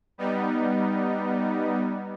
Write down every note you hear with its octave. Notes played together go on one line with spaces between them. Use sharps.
G3 B3 D#4